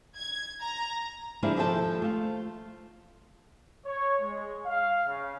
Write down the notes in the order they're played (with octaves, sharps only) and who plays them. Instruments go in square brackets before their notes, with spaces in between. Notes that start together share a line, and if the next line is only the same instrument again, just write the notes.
[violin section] G#6
A#5
[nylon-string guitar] D3 F3 G#3 A#3 D4 E4
D#2 F3 A4 B4 G5 A5
A3 F4
[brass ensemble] C#5
G#3
F5
C#3